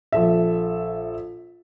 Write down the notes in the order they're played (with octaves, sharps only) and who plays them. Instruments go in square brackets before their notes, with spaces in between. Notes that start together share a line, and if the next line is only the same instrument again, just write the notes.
[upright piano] A#1 A4 E5